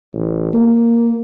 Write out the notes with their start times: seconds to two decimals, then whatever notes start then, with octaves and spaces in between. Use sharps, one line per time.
0.13 A1
0.53 A#3